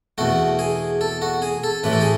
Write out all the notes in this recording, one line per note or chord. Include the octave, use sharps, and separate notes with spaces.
E2 B2 A3 F#4
G#4
A4
F#4
G#4
A4
A1 A2 E3 A3 B4
A4
G#4